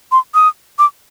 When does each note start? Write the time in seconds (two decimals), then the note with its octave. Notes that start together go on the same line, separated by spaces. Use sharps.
0.12 C6
0.34 D#6
0.79 D6